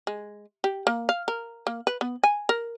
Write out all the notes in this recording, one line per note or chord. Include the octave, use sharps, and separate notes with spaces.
G#3
G4
A#3
F5
A#4
A#3
B4
B3
G#5
A#4